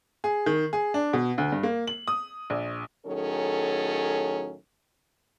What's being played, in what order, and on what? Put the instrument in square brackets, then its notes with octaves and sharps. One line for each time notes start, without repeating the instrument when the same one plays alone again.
[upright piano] G#4
D#3
G#4
D4
B2
D2
G2
A#3
F#7
D#6
A#1
[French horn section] A2 D#3 F#3 C#4 G#4 A4